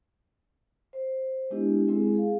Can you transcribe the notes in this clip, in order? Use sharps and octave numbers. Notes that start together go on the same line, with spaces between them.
C5
G#3 B3 D4 E4 G4 D#5
G#3 C4 E4 G#4
G#4 F5